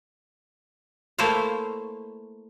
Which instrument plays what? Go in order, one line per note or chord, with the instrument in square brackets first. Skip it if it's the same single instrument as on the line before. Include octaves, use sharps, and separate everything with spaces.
[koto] A3 A#3 E4 C5 C#5 F5